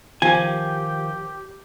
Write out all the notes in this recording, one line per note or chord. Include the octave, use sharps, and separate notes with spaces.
D#3 F3 G4 G#5